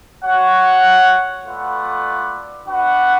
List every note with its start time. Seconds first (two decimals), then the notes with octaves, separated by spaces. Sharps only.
0.24 F#4 C#5 F#5
1.45 A3 F4 B4 D5 F#5
2.68 D4 F#4 B4 F#5